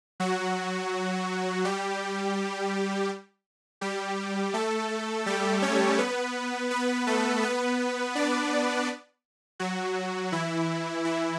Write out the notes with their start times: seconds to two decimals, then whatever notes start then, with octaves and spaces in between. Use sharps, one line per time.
0.20 F#3 F#4
1.65 G3 G4
3.81 G3 G4
4.54 A3 A4
5.26 G3 G4
5.62 C#4 C#5
5.98 B3 B4
6.71 B3 B4
7.07 A3 A4
7.43 B3 B4
8.15 D4 D5
9.60 F#3 F#4
10.32 E3 E4
11.05 E3 E4